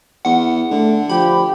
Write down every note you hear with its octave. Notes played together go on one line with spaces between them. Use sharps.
E2 F#5
D3 A3
F3 G4 B5